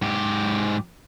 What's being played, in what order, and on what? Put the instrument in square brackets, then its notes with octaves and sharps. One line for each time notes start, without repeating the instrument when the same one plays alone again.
[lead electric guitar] G#2 G4